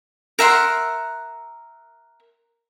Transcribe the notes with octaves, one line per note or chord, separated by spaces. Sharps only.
A#4 E5 F#5 C6